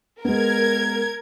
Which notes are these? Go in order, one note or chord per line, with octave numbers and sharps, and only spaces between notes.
G#3 B3 A#4 G#6